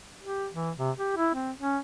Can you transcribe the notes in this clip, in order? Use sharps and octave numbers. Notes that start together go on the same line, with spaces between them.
G4
E3
C3
G4
E4
C4
C#4